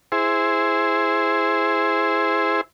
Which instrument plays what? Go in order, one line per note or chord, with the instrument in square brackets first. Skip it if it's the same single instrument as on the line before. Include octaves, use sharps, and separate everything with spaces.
[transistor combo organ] E4 G#4 C5